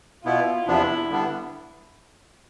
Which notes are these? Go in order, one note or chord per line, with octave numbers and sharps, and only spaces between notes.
B2 B3 E4 F4
E2 C3 F3 B3 D4 E4
D3 G3 B3 D4